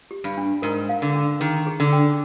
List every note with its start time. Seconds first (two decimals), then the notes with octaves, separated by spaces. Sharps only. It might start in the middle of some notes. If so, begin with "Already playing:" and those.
0.11 G4
0.24 G2
0.38 D4
0.62 G#2 A#4
0.89 F5
1.02 D3
1.15 D4
1.40 D#3 G#4
1.67 G#4
1.80 D3
1.93 G5